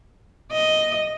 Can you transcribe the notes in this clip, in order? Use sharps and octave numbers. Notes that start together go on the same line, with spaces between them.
D#5